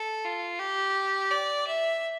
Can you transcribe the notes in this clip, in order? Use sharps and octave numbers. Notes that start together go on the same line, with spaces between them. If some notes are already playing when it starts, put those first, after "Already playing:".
Already playing: A4
F4
G4
D5
E5